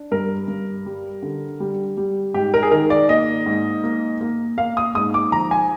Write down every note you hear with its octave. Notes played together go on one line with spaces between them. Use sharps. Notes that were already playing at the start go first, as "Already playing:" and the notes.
Already playing: D4
G2 A#4
G2
G3
D3
G3
G3
G#2 G4
A#4
G#4
D#3 A#4
D5
A#3 D#5
G#2
A#3
A#3
A#3 F5
D#6
G#2 D#6
D6
F3 A#5
G#5